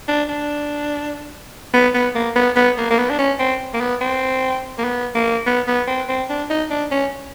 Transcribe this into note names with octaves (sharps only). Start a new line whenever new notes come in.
D4
D4
B3
B3
A#3
B3
B3
A#3
A#3
B3
D4
C#4
C4
A#3
B3
C4
A#3
B3
A#3
B3
B3
C4
C4
D4
D#4
D4
C#4